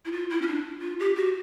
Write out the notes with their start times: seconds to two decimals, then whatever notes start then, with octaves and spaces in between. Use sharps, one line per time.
0.05 E4
0.12 F4
0.30 E4
0.42 C#4
0.47 D4
0.82 F4
1.00 G4
1.16 F#4